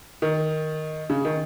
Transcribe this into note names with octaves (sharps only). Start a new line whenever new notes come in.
D#3
C#3
D#3